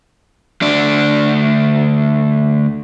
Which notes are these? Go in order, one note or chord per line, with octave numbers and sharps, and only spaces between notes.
D2 D4